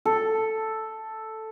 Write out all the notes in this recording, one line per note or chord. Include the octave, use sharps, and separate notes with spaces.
A4